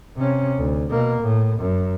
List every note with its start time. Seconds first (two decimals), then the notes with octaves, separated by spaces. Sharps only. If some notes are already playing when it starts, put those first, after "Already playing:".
0.16 C3 C#4
0.58 D2
0.90 B2 A#3
1.22 A2
1.60 F#2